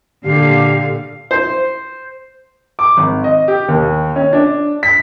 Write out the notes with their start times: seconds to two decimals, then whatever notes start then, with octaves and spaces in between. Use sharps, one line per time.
0.25 A#2 D3 G4 F5
1.31 C5
2.79 D6
2.97 G#1
3.24 D#5
3.48 G4
3.68 D#2
4.16 C#4
4.33 D4
4.83 B6